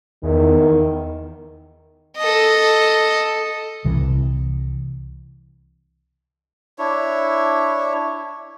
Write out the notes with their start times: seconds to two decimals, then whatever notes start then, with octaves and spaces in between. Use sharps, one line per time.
0.23 E2 D#3
2.17 A4 D#5
3.84 C2 C3 E3
6.79 D4 E4 C#5